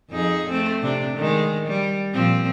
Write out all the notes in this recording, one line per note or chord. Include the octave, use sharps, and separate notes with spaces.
F2 D#4 G#4
A3 C4
C3 D4
D#3 G#3
G3
A#2 F3 C4